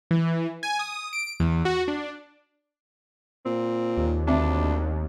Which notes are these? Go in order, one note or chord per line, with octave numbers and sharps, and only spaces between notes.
E3
G#5
D#6
D7
E2
F#4
D4
A#2 C4
D#2
D2 A3 C4 D4 E5